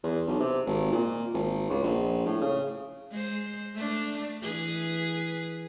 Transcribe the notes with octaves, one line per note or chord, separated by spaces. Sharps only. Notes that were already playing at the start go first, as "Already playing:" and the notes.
E2
B1
C3
G#1
A#2
G#1
C#2
A#1
A2
C#3
G#3 C5
A3 D4
E3 G#4 B4